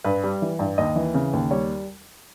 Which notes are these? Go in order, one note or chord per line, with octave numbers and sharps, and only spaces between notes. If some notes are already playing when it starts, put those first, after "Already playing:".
G2 B4
G3
E3
G2
D#2 D#5
E3
C#3
D#2
G3 C#5